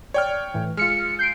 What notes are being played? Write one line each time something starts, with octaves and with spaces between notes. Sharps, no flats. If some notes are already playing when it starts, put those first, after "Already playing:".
C#5 D5 G5 F6
A2 E3
G#3 F4 F6 C#7
G6 C7 D7